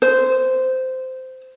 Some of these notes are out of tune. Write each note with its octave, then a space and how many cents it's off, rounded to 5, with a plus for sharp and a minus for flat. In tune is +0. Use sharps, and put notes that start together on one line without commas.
C5 -15